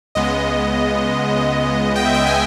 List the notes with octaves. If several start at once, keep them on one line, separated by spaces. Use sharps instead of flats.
C#2 C#3 G#3 B3 D#5
G5
E5
G5
G#5